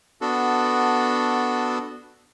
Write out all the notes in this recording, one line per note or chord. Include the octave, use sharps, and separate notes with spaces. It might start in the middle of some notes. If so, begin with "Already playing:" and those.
B3 D4 F#4 A4